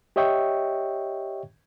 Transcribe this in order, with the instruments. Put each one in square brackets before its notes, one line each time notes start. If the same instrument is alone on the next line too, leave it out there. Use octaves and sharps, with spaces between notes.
[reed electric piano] G4 C#5 D#5 E5 G5 C#6